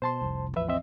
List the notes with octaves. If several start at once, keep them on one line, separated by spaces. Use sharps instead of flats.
B2 C5 A5 C6
F1 C2
A1 E2 F3 B4 E5
C4 D#5 E5